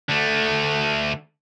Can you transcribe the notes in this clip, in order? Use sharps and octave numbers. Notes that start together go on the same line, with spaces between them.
D3 A3